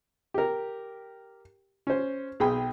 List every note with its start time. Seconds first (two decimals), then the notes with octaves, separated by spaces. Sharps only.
0.34 G4 A#4
1.87 C#4 C5
2.40 B1 G#4 G5 B5